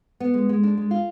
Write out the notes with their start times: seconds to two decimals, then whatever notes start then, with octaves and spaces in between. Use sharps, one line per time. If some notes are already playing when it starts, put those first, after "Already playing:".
0.20 B3
0.34 G#3
0.49 G#3
0.63 D4
0.78 G#3
0.91 F4